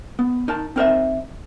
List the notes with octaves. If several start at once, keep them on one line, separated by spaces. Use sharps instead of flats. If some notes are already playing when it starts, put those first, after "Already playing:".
B3
D#4 A#4 A5
C4 D#4 A#4 C5 D#5 E5